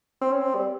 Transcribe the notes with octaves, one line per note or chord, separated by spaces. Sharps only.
C4
C#4
C4
G3